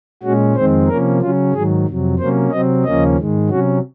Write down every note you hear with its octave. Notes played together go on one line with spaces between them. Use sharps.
A#2 G#3 C#4 F#4
F2 D#3 G#3 C4 C5
C3 F3 A#3 C#4 A#4
C#3 F#3 C#4 F4
G#2 D#3 F#3 G#4
F2 C3 F#3
C3 F#3 A#3 C#4 C5
C3 F#3 C4 D#5
D#2 C#3 F3 A#3 C#4 D#5
G#2 D#3 G#3
C3 F#3 C#4 F#4